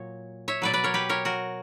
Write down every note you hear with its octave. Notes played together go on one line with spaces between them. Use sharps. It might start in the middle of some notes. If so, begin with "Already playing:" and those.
Already playing: A#2 F#3 C#5
C#5 E5
B2 F#3 B4 D5
B4 D5
A#4 C#5
G4 B4
A#4 C#5
F#4 A#4